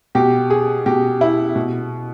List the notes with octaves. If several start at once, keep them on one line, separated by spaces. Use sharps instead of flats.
B2 G4
G#4
B2 G4
E4
B2